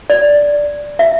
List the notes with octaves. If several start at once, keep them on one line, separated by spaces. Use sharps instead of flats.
D5
E5